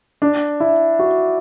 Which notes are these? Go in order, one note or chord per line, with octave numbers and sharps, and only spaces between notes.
D4
E4
F#4